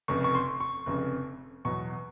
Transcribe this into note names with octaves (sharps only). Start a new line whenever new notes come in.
F1 F2 C#3 C#6
C#6
C6
C#6
F1 F2 C#3
E2 B2 F#3 B3 C#6